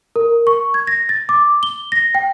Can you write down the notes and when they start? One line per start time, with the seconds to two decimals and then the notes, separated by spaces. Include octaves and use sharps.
0.16 A#4
0.47 C#6
0.74 G#6
0.87 A#6
1.09 A6
1.29 D6
1.63 G7
1.92 A#6
2.15 G5